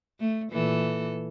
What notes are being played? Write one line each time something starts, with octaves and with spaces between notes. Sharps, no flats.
A3
A#2 E3 A4